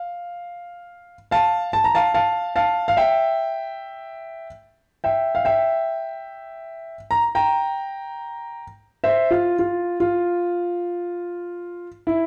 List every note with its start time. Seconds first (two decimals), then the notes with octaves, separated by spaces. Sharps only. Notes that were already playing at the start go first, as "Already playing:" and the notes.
Already playing: F5
1.31 F5 A5
1.73 A5
1.84 A#5
1.95 F5 A5
2.14 F5 A5
2.56 F5 A5
2.88 F5
2.97 E5 G5
5.04 E5 G5
5.35 F5
5.45 E5 G5
7.11 A#5
7.35 G5 A#5
9.04 C5 E5
9.31 F4
9.59 F4
10.00 F4
12.07 E4